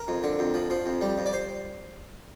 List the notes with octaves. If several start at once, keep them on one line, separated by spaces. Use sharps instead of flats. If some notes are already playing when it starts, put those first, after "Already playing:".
Already playing: A#4
F2
D3
F2
F3
F3
F2
G3
F2
D5
C5